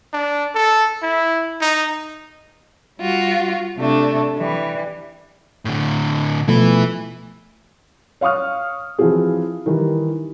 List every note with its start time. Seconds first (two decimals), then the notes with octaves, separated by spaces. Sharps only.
0.13 D4
0.55 A4
1.03 E4
1.61 D#4
2.98 G3 F4 F#4
3.76 C3 A3 D4
4.36 E3 G3
5.65 A2 D3
6.48 B2 F3 A3 E4 B4
8.21 C#5 F5 C#6 D#6 F6
8.99 E3 F3 C4 F#4 G#4
9.66 D#3 E3 G3